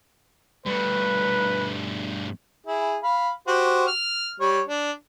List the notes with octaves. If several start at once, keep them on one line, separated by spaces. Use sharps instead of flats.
G2 A3 B4
E4 G#4
F5 B5
F#4 G4 C5
F6
G3 C#5
D4